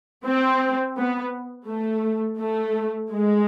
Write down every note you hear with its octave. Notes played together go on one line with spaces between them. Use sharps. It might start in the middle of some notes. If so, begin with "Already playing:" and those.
C4
B3
A3
A3
G#3